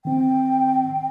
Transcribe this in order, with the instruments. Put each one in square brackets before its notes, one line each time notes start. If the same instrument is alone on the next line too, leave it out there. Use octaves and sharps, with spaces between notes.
[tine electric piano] D#3 C4 [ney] G5